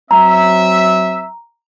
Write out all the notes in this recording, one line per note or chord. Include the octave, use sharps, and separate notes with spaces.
F#3 C4 E5 A#5